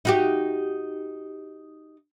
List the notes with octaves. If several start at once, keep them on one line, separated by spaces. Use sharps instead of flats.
D#4 F#4 G4